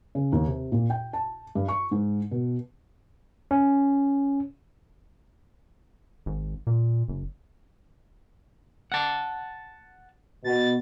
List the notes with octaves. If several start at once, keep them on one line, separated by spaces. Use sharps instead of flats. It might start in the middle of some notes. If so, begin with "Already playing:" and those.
C#3
D#2
C3
A#2
G5
A5
G2
C#6
G#2
B2
C#4
G#1
A#2
F#1
F#5 A5
B2 A6